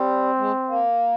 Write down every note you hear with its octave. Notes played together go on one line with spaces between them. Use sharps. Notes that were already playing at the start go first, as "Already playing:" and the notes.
Already playing: G3 C4
G#3
A#3